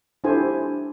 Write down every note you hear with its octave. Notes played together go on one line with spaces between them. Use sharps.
D4 E4 G4 A4 C5 G#5